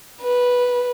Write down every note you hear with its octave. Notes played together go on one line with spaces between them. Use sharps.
B4